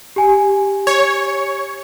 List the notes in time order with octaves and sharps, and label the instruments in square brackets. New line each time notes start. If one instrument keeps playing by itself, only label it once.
[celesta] G4 G#5
[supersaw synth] C#5